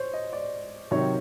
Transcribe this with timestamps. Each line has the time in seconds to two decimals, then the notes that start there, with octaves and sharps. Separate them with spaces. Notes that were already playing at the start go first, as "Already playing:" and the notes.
Already playing: C5 C#5
0.14 D#5
0.33 D5
0.91 C3 D#3 F#3 C#5